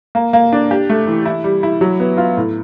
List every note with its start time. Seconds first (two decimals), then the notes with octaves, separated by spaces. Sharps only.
0.15 A#3
0.33 A#3
0.53 D4
0.71 G4
0.89 A3
1.07 E3
1.25 E4
1.44 G3
1.63 E4
1.81 F#3
2.00 B3
2.18 F4
2.37 A2